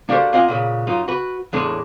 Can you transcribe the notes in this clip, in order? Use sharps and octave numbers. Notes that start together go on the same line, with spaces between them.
A#3 D4 F#4 G4 A4 C5
A#3 C4 F4 D#5 F#5 G#5
A#2 C#3 B3
F#2 D#4 F4
F#4 B4
E2 A2 G#3 C#4 D4